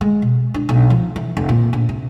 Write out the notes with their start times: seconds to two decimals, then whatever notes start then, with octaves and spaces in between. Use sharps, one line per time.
0.01 G#3
0.22 B2
0.54 D4
0.69 B1
0.90 F3
1.16 E3
1.37 F1
1.49 A#2
1.73 A#1
1.89 C3